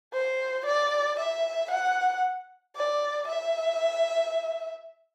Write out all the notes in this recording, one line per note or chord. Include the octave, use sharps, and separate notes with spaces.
C5
D5
E5
F#5
D5
E5